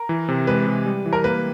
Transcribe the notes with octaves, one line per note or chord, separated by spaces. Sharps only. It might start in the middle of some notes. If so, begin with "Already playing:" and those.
Already playing: A#4
E3
C3
G#3 B4
C3
G3
E3
A#4
A#3 B4